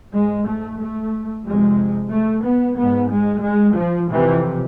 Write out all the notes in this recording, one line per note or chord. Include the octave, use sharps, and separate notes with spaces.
G#2 G#3
A3
A3
F2 C3 G#3
A3
B3
G#2 B3
G#3
G#3
F3
F2 C3 E3